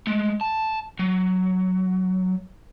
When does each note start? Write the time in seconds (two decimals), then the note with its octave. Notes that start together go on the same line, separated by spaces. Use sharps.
0.07 G#3 A3
0.41 A5
0.99 F#3